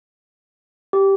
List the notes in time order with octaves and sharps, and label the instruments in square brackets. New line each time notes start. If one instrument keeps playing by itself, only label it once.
[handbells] G4